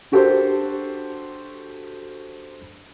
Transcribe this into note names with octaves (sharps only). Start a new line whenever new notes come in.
D4 F#4 G4 A4 A#4 C5